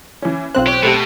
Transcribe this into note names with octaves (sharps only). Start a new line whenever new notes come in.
E3 C#4
B1 C4 F4 C5 F#6
G4 C#5
B2 A3 G4 A4